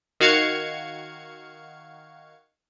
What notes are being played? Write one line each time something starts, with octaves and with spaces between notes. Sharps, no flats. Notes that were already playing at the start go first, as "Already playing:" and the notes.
D#3 F#4 F5 G#6 C#7